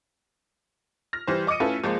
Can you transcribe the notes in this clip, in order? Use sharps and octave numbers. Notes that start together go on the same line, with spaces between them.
F6 A#6
E3 G3 C5
D#5 D6 D#6 C#7 D#7
A3 C#4 E4 F4 A4 B4
C#2 F3 G#3 A#3